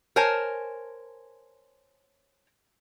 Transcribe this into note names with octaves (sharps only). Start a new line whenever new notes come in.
A#4 C5 C#5 G#5 A5